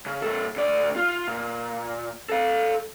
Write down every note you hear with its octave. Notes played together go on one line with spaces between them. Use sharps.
C#3
A#2 A4
D2 D5
F4
A#2
A4 F5